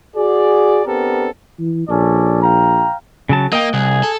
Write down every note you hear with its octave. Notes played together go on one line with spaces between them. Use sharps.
F#4 G#4 D5
B3 C4 D4 G4 A4 A#4
E3
A#1 C#4 A4 D5
F5 G5 A#5
C#3 F#3 A5
A#3 D#5 G5
C2 G#4
A4